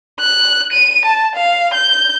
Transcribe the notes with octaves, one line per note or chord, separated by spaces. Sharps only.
F#6
D#7
A5
F5
G6